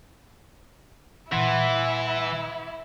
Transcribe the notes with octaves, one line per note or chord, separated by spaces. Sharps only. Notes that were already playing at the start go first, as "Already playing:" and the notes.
A#2 E3 G3 E4 F#5 C6